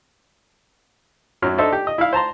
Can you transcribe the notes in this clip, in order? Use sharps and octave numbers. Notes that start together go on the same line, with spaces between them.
F#2 F#3 F6
D4 D#4 A4 C5 E5
G4
D#5
E4 F5
C5 A5 A#5 C6